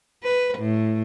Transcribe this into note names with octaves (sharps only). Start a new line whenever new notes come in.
B4
A2